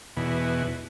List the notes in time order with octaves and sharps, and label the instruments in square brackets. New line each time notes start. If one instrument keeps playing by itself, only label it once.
[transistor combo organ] E2 B2